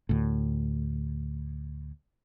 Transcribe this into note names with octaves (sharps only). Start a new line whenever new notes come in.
D2 A2